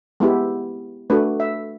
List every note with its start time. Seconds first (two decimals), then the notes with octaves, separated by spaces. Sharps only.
0.20 G#3 B3 E4 G4
1.10 A3 D4 F#4 B4
1.40 E5